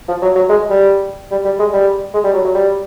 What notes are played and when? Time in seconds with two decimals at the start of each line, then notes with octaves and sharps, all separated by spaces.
0.08 F3
0.22 F#3
0.35 F#3
0.49 G#3
0.70 G3
1.31 G3
1.45 G3
1.59 G#3
1.73 G3
2.14 G#3
2.24 G3
2.34 F#3
2.44 F#3
2.55 G3